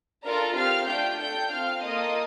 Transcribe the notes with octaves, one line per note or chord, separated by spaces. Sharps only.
D4 F4 A4 A#4 A#5
C4 G4 F5 F6
A3 D4 F4 G5 G6
D4 A4 G5 G6
C4 F4 A4 F5 F6
A#3 F4 A4 D#5 D#6